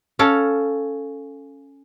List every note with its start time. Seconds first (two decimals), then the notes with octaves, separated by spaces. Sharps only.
0.19 C#4 A4 F5